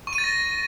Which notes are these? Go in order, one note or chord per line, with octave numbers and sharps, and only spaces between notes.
C#6
D#7
A6
A#6